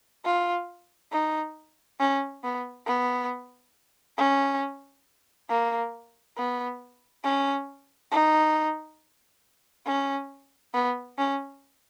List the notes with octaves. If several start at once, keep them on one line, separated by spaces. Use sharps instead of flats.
F4
D#4
C#4
B3
B3
C#4
A#3
B3
C#4
D#4
C#4
B3
C#4